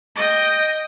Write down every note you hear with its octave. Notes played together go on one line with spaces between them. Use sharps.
D#5 G5